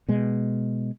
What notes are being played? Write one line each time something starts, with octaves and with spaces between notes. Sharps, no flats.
B2 G#3